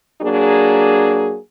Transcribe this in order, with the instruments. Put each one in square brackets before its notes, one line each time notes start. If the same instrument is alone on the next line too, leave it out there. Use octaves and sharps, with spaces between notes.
[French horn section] F#3 A#3 D4 G#4